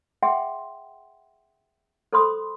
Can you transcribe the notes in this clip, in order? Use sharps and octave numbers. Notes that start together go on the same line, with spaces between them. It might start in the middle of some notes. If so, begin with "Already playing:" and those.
G#4 E5 F#5 G5 C6
A4 C5 B5 C6 D#6